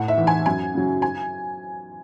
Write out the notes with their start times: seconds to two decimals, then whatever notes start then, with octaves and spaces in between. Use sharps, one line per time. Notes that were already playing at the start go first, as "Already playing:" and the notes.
Already playing: A2 F#5
0.08 E5
0.18 E3
0.27 G#5
0.46 F#2 G#5
0.74 C#3 F#3
1.02 G#5